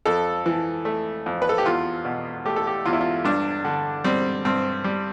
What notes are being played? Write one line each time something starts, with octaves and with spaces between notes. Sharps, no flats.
F2 A4
E3
A3
F2
B4
A4
G4
E2 F4
B2
A3 G4
A4
G4
E2 F4
E4
F4
G2 D4
D3
G3 C4
G2 C4
G3